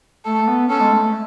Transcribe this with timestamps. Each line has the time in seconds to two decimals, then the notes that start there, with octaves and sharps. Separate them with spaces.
0.25 A3 A4
0.42 A3
0.48 B3
0.68 C#4 A4
0.80 G#3
0.92 A3
1.02 A3